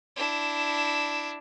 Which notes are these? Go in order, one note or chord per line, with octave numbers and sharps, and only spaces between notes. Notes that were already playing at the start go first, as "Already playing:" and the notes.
D4 E4